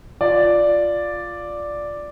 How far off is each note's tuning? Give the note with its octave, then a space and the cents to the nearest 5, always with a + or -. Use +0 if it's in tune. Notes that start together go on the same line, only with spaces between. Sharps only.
F4 +0 D5 +0